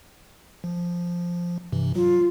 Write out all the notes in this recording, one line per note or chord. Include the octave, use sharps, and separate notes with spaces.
F3
G2 C3 E3
F#3 F4